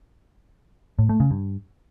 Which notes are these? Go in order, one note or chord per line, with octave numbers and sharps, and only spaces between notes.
A2
A3
C#3
G2